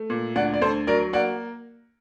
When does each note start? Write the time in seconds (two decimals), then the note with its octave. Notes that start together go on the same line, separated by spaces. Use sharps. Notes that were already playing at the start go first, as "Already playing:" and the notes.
Already playing: A3
0.10 A#2
0.36 D2 D5 F#5
0.54 D5
0.61 D2 A4 C5
0.87 F#3 A#4 D5
1.13 A#3 D5 F#5